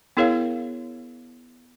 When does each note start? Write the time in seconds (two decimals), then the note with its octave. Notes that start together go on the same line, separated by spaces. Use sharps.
0.17 B3 E4 G#4 A#4 C#5 F5